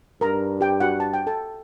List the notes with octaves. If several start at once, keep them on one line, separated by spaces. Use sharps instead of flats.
G2 A#4 A#5
G4 G5
F#4 F#5
A5
G5
A4 A5